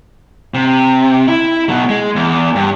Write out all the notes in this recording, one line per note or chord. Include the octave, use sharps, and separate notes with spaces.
C3
E4
B2 F#3
G#3
E2
G2